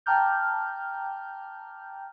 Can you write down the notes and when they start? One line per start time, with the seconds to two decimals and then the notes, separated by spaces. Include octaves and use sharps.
0.06 G5 A5 A#5 D6 F6 G6